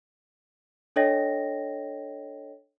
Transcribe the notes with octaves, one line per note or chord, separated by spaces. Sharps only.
D4 A4 C#5 D#5 G5 A#6